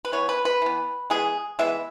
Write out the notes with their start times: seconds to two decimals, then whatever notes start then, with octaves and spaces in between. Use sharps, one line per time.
0.05 B4
0.12 E3 B3 C#5
0.29 B4
0.45 B4
0.62 E3 B3
1.10 E3 G#3 B3 G#4
1.59 E3 G#3 B3 E5